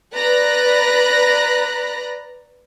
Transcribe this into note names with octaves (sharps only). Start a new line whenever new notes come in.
B4 D5 A#5 B5 F#6 A#6